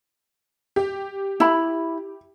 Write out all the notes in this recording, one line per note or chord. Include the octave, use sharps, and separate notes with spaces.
G4
E4 B5